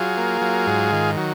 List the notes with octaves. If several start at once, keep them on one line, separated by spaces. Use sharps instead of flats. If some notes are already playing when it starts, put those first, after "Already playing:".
Already playing: F#3 F4 G#4
A#3
F#3
G#2
D#3
F#3